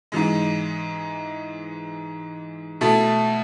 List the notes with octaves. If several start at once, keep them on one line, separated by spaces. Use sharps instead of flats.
G#2 E3 G#3
B2 A3 E4 A4